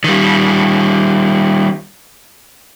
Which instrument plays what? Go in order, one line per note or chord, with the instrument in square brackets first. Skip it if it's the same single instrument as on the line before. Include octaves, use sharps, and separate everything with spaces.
[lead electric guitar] D#3 G3